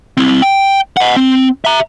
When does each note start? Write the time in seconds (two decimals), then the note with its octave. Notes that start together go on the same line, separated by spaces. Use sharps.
0.17 C4 E4
0.42 G5
0.97 D#5 F#5
1.16 C4
1.65 E5 A#5